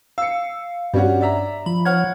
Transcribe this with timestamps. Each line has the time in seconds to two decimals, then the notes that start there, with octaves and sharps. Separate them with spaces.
0.18 F5 E6 C#7
0.94 G2 G3 C#4 F#4
1.21 D5 E5 A#5
1.66 F3 B5
1.85 C#5 F#5 F6 G#6